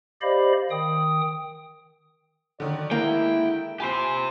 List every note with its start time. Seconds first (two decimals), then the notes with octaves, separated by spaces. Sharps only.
0.22 G4 C5 D5 D#5 F5 B5
0.71 D#3 G5 D#6
2.60 D3 D#3 F#3 C#5 D5
2.91 G#3 A#3 E4 G5
3.80 F4 G4 C5 G#5 B5 C7